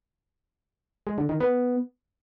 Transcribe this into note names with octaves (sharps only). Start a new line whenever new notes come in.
G#3
D3
D#3
B3